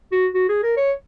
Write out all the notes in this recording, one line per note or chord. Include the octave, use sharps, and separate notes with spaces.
F#4
F#4
G#4
A#4
C#5